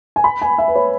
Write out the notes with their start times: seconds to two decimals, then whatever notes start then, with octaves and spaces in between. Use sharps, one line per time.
0.16 G#5
0.24 B5
0.42 G#5
0.58 E5
0.68 B4
0.76 C#5